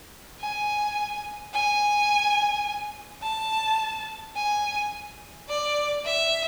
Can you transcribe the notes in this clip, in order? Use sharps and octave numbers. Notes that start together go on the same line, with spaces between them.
G#5
G#5
A5
G#5
D5
E5